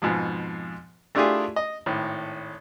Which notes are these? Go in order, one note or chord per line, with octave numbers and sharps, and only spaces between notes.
F2 G#2 B2 F3
A3 D4 E4 F4 G4 G#4
D#5
G#1 A2